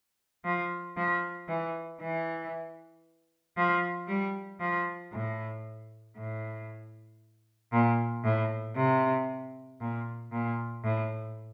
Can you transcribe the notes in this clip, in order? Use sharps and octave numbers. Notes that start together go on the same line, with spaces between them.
F3
F3
E3
E3
F3
G3
F3
A2
A2
A#2
A2
C3
A#2
A#2
A2